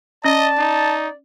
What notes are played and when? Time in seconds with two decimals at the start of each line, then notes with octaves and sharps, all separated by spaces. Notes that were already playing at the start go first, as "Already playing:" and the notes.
0.24 C#4 D5 D#5 A5
0.58 D#4